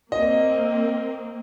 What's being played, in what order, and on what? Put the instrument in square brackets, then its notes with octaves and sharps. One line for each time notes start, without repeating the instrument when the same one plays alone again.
[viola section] A#3 C4 [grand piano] D#5